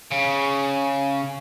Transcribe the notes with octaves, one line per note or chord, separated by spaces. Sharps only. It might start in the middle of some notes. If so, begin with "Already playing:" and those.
C#3